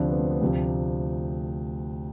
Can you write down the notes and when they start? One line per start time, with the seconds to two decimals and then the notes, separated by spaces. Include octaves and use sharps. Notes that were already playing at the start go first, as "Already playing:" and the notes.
Already playing: D2 C3 F3 C4 D4
0.08 B3
0.19 C4
0.31 B3
0.41 D2 C3 F3 C4